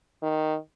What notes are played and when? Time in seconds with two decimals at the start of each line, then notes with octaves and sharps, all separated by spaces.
0.22 D#3